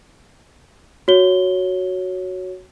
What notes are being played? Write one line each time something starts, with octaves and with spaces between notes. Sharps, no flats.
F#4 C#5 G7